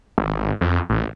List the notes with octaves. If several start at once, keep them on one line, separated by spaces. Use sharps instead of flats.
G#1
F2
A1